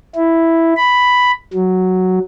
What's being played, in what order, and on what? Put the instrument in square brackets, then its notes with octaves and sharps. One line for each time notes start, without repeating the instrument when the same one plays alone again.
[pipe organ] E4
B5
F#3